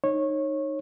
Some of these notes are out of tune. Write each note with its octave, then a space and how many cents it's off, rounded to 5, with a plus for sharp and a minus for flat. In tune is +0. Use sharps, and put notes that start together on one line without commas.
D#4 -15 C#5 -20